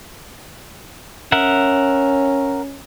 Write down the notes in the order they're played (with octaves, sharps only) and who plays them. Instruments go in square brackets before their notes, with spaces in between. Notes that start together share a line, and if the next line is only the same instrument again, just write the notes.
[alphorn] C#4 [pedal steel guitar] A#4 E5 F#5